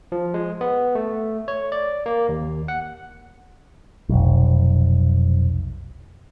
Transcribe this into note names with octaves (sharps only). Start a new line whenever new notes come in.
F3
G#3
B3
A3
C#5
D5
A#3
D#2
F#5
F1 B1